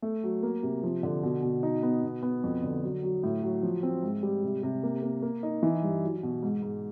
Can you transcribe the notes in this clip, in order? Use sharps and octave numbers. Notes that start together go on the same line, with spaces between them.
A3
F#3
A#3
C3
F3
D3
B2
B2
D#4
B3
B2
B3
F2
D3
F#3
F#3
A2
F#3
F3
C4
G#2
G3
C3
C3
A#3
A#3
A#3
D#4
E3
G2
F#3
B2
G#2
G#2